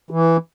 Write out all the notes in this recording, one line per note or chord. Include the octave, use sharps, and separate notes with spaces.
E3